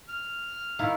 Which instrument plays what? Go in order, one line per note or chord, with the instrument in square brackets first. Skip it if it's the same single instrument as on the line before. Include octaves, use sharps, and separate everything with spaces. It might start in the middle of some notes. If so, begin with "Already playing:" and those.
[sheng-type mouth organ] F6
[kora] D#3 A#3 E4